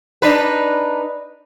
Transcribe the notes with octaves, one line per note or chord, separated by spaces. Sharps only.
D4 D#4 B4